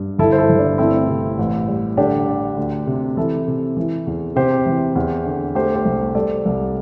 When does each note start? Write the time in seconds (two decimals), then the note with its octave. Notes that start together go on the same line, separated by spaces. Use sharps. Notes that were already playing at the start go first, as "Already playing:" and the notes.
Already playing: G2
0.18 G1 E4 A4
0.32 C5
0.38 E4 A4
0.49 G1
0.59 D4
0.78 A3 C4 E4
1.08 C3
1.39 A1
1.68 G3
1.97 D3 D4 G4
2.27 D3
2.57 D2
2.87 C3
3.17 E3 E4 A4
3.47 C3
3.77 E3
4.07 E2
4.36 C3 G4 C5
4.66 E3
4.96 E2
5.25 D3
5.55 A3 G4 C5
5.75 G4 C5
5.85 C2
6.15 G3 A4 D5
6.45 C2